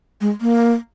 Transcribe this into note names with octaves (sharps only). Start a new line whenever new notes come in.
G#3
A#3